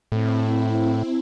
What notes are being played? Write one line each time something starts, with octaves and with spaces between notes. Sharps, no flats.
A2 C4 E4